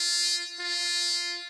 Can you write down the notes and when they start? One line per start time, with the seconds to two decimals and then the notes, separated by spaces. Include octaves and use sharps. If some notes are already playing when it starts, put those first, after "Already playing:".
Already playing: F4
0.61 F4